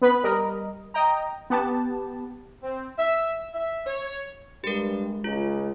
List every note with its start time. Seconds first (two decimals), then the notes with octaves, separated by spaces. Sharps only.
0.02 B3 B4 B5
0.23 G3 A#4 D#5
0.94 D#5 G5 A#5
1.50 B3 G4 A5
2.62 C4
2.98 E5
3.53 E5
3.86 C#5
4.64 G2 G#3 G4 A#4
5.24 C#2 F4